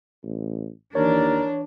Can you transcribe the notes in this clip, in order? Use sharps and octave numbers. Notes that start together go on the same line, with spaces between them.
A1
D#2 E3 D4 A#4 C#5